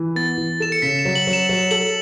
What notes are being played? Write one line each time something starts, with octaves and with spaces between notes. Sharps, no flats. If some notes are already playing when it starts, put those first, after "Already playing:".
Already playing: E3
B3 A6
E3
A4 E7
C#7
C#3 B6
E7
F#3
F#7
F#3
E7
F#3
A4 F#7